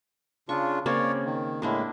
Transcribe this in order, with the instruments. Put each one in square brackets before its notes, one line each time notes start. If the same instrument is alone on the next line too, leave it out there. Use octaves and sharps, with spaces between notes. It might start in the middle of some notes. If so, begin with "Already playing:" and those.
[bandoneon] C#3 D4 F4 [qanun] C#6
[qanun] C#3 A#3 C4 [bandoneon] C#5 D5
[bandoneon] D#3
[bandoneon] A2 G#3 [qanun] A#3 D4 E4